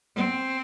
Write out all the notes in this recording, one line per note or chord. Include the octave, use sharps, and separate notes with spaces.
C4